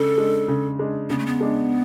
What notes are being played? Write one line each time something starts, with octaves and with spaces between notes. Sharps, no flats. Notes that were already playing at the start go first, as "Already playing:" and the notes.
Already playing: C#3 G#3 D4 A4
G#3 D4
C#3
G#3 D4
C#3 B3
A3
B3
G#3 D4